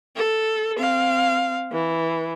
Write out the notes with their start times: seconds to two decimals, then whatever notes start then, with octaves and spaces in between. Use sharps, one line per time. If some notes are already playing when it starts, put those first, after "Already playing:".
0.17 A4
0.78 C4 F5
1.72 E3